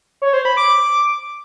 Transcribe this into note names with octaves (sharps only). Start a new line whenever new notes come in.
C#5
C5
B5
D6